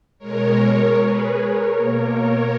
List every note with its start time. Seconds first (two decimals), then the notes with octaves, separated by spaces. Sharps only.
0.19 B2 G#3 A#4 C#5
0.97 G#4 B4
1.36 A#4 C#5
1.75 B2 A#3 A#4 C#5
2.14 A#4 C#5